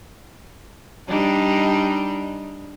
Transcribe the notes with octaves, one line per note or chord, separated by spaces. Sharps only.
G3 D4 D#4